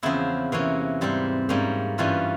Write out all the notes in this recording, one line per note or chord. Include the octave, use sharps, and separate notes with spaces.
E2 C#3 F3 C4 E4
C3 E3 A#3 C#4
G#2 G3 C4
G#2 G3 A#3 C#4
G2 E3 G3 C#4 F4